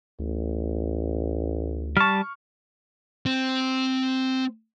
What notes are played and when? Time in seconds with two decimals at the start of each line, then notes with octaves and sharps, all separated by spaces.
0.19 A1 D2
1.97 G3 A5 C#6 F6
3.26 C4